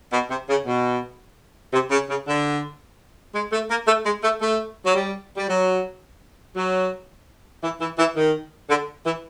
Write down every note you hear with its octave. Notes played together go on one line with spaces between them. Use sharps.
B2
C3
C#3
B2
C3
C#3
C#3
D3
G#3
A3
A#3
A3
G#3
A3
A3
F#3
G3
G3
F#3
F#3
E3
E3
E3
D#3
D3
E3